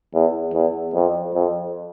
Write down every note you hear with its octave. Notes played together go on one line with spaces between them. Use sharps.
E2
E2
F2
F2